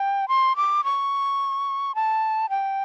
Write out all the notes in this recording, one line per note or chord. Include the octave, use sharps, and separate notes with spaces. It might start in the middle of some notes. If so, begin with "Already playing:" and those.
Already playing: G5
C6
D6
C#6
A5
G5